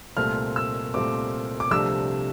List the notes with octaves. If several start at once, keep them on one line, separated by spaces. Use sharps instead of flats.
C2 A#2 A3 C4 F6
E6
C2 A#2 A3 C4 D6
D6
C2 C3 F3 A3 D4 E6